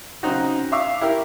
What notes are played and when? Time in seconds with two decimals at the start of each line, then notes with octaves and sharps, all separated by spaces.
0.23 C#3 F#3 C4 D#4 F#4
0.72 E5 F5 C#6 D6 E6
1.01 E4 G4 A#4